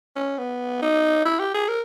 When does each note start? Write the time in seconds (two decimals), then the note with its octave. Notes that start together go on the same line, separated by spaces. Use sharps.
0.16 C#4
0.38 B3
0.82 D#4
1.25 E4
1.39 G4
1.54 G#4
1.68 A#4